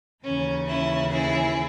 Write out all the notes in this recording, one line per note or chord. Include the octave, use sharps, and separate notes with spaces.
D#2 C#3 E3 C#4
C#4 E4
E4 G#4